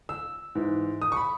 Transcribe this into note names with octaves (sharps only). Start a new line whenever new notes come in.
E6
G#2 E3
D#6
C#6
B5